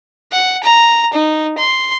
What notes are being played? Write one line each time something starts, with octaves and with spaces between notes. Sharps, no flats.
F#5
A#5
D#4
C6